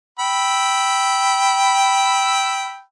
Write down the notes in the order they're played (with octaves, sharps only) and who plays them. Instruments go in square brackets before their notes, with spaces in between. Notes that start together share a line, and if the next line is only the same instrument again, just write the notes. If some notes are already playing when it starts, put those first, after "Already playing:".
[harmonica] G5 B5 E6